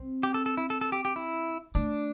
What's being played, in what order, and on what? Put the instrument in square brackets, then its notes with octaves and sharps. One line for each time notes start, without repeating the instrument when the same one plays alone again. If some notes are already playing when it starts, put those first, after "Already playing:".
Already playing: [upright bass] C4
[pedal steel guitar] G4
A4
A4
E4
A4
A4
G4
G4
E4
[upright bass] A3 [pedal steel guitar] D4